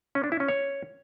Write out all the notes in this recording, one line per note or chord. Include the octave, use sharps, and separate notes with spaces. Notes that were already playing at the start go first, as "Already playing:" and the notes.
C#4
D4
E4
C#4
C#5